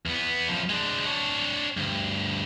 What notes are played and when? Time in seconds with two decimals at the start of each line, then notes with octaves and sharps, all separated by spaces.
0.06 E2 B3
0.48 F#2 F3
0.70 G#3 D4
1.06 D4 C#5
1.77 D2 G2